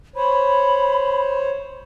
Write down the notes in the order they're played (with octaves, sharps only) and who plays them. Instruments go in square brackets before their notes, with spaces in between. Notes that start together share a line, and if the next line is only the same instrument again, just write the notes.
[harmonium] C5 C#5 [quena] B5